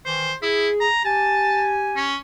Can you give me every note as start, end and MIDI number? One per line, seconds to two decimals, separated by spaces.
0.06 0.31 51
0.06 0.31 52
0.06 0.34 72
0.43 0.69 64
0.43 0.86 68
0.81 1.03 82
1.05 2.10 67
1.05 2.10 80
1.05 1.71 81
1.97 2.16 61